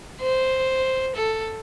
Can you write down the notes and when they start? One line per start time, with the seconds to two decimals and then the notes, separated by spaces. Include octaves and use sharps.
0.22 C5
1.15 A4